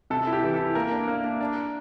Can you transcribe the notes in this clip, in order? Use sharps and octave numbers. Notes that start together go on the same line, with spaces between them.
C3 A4
E4
G4
E3
A4
E4
A#3 A#4
D4
A#3
D4
D4